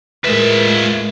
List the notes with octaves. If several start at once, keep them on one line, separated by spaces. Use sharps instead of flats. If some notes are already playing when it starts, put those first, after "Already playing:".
A2 G#3 F4 A#4 B4 E5